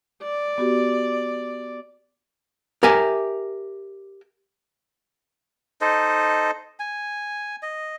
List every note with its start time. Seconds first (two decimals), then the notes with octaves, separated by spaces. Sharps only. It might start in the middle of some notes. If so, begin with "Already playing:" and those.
0.22 D5
0.58 B3 F#4 G4
2.83 G4 A#4 E5 G#5
5.81 D#4 A4 C5 D#5
6.79 G#5
7.63 D#5